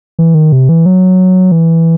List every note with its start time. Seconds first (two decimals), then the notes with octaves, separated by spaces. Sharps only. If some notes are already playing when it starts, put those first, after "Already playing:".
0.19 E3
0.34 D#3
0.52 C3
0.69 E3
0.86 F#3
1.52 E3